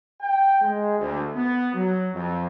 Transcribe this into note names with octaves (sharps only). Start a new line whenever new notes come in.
G5
G#3
D2
B3
F#3
F2